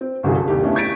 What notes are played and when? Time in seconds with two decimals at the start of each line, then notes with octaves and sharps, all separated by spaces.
0.01 C4
0.23 G1 C2 C#3 F#3 F#4 G#4
0.35 A4
0.48 D#2 C3 G4
0.63 A3 B3 C#4 D4 E4
0.75 C#6 G#6 A6 B6 D7